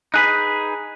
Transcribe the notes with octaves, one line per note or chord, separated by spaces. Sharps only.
D#4 G#4 B4 F#6 B6